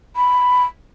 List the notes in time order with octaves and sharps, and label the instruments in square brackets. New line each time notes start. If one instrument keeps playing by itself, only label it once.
[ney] B5